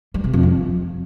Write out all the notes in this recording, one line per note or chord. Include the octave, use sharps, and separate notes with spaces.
G3
C3
F2
F3